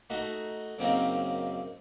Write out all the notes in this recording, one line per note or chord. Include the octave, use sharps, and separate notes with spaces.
A3 D#4 F#4
F#2 C#3 A#3 C4 D#4